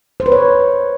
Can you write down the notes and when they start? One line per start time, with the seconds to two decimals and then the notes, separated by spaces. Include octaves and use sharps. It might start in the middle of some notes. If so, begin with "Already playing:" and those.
0.20 C5
0.26 B4
0.32 C#5